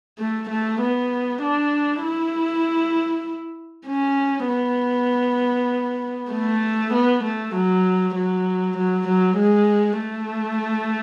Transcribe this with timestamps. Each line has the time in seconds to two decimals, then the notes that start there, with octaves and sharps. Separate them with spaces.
0.19 A3
0.50 A3
0.81 B3
1.42 D4
2.03 E4
3.87 C#4
4.48 B3
6.32 A3
6.93 B3
7.24 A3
7.55 F#3
8.15 F#3
8.77 F#3
9.08 F#3
9.38 G#3
9.99 A3